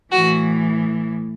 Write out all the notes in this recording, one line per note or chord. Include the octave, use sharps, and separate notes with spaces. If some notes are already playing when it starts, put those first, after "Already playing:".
A2 E3 F#4